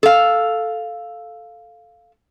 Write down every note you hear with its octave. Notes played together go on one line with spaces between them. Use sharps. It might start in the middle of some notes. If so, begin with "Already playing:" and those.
A4 F5